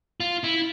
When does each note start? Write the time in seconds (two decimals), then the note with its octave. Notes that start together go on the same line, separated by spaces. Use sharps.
0.20 F4
0.44 E4